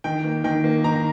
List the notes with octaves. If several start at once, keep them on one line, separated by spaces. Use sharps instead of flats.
D#3 G5
A#3
D#3 G5
A#3
D#3 A#5